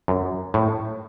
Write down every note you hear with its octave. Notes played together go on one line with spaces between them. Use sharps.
F#2
A2